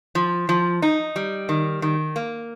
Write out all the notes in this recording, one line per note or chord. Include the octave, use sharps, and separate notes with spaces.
F3
F3
D#4
G3
D#3
D#3
A#3